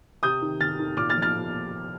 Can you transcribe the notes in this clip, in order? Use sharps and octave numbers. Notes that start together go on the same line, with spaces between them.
C3 D#6 G6
D#3
C3 F6 A6
D#3
A#2 D6 F6
F6 A6
F3
F6 A6
A#2